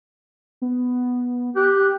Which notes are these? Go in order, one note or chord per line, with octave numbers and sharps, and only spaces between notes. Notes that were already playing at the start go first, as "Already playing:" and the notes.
B3
G4 F#6